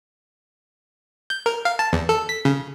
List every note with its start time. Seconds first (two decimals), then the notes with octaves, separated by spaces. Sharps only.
1.30 G6
1.46 A#4
1.65 F5
1.79 A5
1.93 E2
2.09 A4
2.29 B6
2.45 C#3